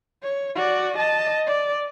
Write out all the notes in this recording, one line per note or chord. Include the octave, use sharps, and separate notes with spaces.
C#5
F#4 D5
D#5 A5
D5